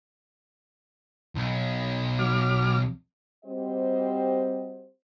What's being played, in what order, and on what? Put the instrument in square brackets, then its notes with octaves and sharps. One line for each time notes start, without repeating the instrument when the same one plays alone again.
[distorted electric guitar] B1
[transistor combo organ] F#3 D6 F6
[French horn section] G3 C4 F#4 G4 C5 D#5